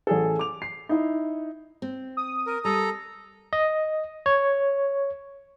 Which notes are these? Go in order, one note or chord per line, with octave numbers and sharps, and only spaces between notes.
A1 G#4 A4
D6 F7
C7
D#4 E4
C4
D#6
A#4
G3 A4 A#5
D#5
C#5